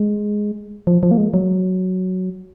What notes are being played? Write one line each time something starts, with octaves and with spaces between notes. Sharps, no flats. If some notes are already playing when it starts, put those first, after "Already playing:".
Already playing: G#3
F3
F3
A#3
G#3
F#3